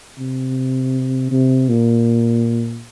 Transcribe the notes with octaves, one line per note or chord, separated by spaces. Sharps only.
C3
C3
A#2